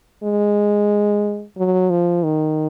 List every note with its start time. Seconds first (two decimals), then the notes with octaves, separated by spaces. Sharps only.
0.23 G#3
1.57 F#3
1.90 F3
2.23 D#3